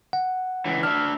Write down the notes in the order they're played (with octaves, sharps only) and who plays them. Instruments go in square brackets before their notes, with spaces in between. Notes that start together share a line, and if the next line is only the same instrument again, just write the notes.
[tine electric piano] F#5
[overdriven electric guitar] C#2 E3
[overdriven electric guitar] D4 E5 [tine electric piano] F6